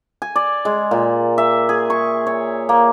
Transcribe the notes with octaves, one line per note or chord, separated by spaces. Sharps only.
G#5
D5
G#3
A#2
E5
G#4
C#6
C#5
A#3